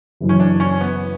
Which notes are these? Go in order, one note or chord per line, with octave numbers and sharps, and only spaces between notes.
F#1 F#2 E3
C#4
D4
C#4
B3